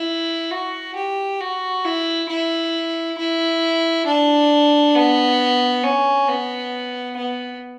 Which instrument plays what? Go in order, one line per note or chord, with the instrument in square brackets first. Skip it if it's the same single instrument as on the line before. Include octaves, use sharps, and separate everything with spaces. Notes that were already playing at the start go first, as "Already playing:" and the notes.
Already playing: [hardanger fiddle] E4
F#4
G4
F#4
E4
E4
E4
D4
B3
C#4
B3
B3